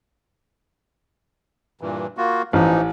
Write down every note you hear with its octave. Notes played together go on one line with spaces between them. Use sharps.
G2 A#2 E3
A#3 F4 F#4
A1 E3 F3 D#4